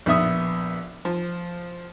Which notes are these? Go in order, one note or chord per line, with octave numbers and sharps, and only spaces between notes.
A#1 B3 E5 D#6
F3